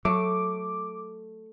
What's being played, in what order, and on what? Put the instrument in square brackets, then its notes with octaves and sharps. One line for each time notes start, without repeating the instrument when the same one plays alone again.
[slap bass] F#3 [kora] A3 [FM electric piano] D6